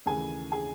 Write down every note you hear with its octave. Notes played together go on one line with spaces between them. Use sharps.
D#2 C#3 E3 A3 G#4 G#5
G#4 G#5